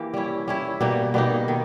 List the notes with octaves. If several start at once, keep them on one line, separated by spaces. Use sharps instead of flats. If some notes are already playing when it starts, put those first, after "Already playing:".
Already playing: E3 A#3 G4
G3 C#4 E4
G3 C#4 E4
B2 G3 A#3 D#4
B2 G3 A#3 D#4
D#3